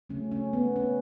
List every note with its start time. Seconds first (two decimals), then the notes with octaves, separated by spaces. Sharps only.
0.10 C#3 F#3 A3 C#4
0.32 C#4
0.53 B3
0.76 C#4